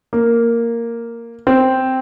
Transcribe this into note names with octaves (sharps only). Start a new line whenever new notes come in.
A#3
C4